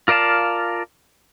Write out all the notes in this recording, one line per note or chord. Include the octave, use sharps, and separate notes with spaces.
F4 A#4 D5 F5 A5